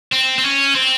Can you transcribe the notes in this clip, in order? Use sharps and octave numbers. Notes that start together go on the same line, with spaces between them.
C4
C4
C#4
C4